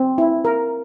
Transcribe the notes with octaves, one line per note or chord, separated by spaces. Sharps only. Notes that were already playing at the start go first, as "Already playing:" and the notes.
Already playing: C4
E4
A#4